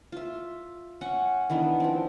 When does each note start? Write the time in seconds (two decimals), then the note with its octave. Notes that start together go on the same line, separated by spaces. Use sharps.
0.12 F4 E5
1.01 C#4 F#5
1.50 D#3 E3 B3 D4
1.80 F3 C4